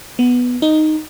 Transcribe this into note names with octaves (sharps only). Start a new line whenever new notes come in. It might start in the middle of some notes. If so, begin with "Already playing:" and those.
B3
D#4